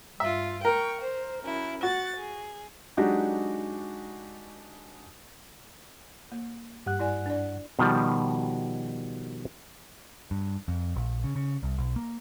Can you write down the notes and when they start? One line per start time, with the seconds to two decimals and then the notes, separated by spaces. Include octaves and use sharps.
0.20 G2 F4 E5
0.65 A#4 G5 C#6
1.00 C5
1.44 F#2 E4
1.83 F#4 F#5 A6
2.16 G#4
2.97 F#3 G#3 D4 D#4 F#4 G4
6.32 A#3
6.86 G2 G4 F#5 F#6
6.99 E4 D5 G#5
7.26 D4 D5
7.79 B2 D#3 F3 G3
10.31 G2
10.68 F2
10.96 A#1
11.24 C#3
11.36 C#3
11.63 C2
11.78 B1
11.96 A#3